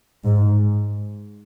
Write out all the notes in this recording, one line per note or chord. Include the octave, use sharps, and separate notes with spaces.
G#2